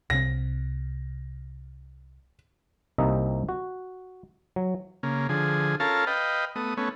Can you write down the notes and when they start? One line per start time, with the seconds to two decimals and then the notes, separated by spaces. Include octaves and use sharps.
0.10 C2 C3 C4 A#6
2.98 C2 C3 A#3 D#4 D#5 E5
3.49 F#4
4.56 F#3
5.03 C#3 A#3
5.29 D3 F3 G#4
5.80 C#4 F4 A4 A#4 F5 A5
6.07 B4 D#5 F5 G5
6.56 A3 B3 D#6
6.77 A3 B3 C#4